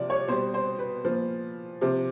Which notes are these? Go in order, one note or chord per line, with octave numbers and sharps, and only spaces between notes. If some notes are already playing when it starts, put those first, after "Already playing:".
Already playing: C3 F3 D5
C#5
B2 G3 C5
C5
B4
A#2 F3
C3 F3